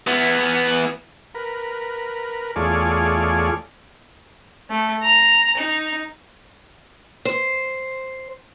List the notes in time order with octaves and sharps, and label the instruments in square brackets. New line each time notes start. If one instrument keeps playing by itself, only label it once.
[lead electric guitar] E3 B3
[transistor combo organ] A#4 B4
E2 A3 F4 G#4 C#5 D5
[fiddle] A3
A#5
D#4
[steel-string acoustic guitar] C5